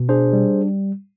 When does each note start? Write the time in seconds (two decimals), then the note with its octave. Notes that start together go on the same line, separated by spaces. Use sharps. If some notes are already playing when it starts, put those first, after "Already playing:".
Already playing: B2
0.09 D4 G#4 C5
0.33 G3